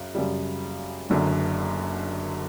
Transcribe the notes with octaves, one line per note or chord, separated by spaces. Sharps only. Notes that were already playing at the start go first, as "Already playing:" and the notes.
Already playing: F#2 C#3
F#2 C#3 G3
F#1 F#2 D3